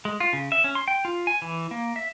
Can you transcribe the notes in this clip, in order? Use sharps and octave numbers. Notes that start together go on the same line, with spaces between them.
G#3
F4
C#3
E5
C#4
C6
G5
F4
G#5
E3
A#3
E5